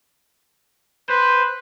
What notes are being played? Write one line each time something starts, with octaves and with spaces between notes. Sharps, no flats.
B4 C5